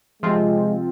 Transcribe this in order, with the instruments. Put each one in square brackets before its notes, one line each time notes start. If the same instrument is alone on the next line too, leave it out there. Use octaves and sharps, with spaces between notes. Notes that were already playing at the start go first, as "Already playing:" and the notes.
[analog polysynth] C3 F3 C4 F4 [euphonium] G#3